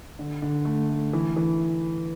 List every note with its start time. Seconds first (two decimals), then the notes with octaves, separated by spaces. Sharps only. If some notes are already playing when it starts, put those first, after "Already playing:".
0.19 D3
0.42 D3
0.65 A3
0.90 A3
1.13 E3
1.36 E3